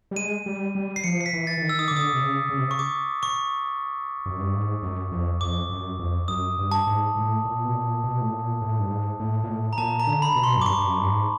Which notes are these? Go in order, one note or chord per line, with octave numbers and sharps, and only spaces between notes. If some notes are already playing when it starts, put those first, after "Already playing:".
G3
G#3 D#7
G3
G3
C7
F3 C#7
C7
B6
E3
A6
E3
D#3
E6
D#6
D3 D6
D#6
C3
C#3
C#3
C3
C#3
C#6
D6
C#6
F#2
G2
G#2
F#2
F2
F2 D6
F#2
F2
F#2 D#6
G2
A5
G#2
A2
A#2
B2
A#2
B2
A2
A#2
A2
G2
G#2
A2
A#2
A2
A#5
A#2 A5
A#5
D3
B5
B2
C6
F#2
D6
G2 C#6
G2
F#2
G2
G#2